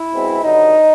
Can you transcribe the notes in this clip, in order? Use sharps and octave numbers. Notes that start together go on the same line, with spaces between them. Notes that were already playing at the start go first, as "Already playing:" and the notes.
Already playing: E4
B2 G#3 C4
G2 D3 F#3 D#4